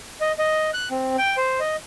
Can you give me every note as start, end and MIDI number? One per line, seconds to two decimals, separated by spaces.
0.21 0.32 75
0.39 0.70 75
0.74 0.89 90
0.91 1.16 60
1.18 1.36 79
1.37 1.60 72
1.60 1.76 75